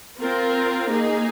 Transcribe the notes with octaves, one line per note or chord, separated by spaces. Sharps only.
C4 F4 A#4
A#3 D#4 G#4